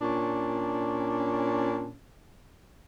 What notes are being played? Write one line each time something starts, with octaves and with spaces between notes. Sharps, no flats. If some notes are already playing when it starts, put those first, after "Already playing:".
A#2 C#4 D4